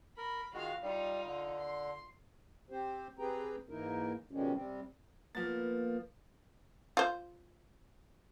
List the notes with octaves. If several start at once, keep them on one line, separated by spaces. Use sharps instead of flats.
A#4 B5
D#3 G#3 F4 F#4 F5
G3 D#4 F4
D3
C6
C4 G4 C5
C4 G4 G#4 B4 G5 A#5
G#2 E3 A#3 D#4 E4 A#4
B2 D#3 F3 G3 G#3 C#4
C3 G3 C4
F3 A#3 B3 A6
F4 C5